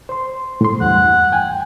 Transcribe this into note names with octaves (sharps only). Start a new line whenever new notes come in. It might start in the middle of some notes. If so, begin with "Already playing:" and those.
C5 C6
A2 C6
E2 G2 F#5
G5 G#5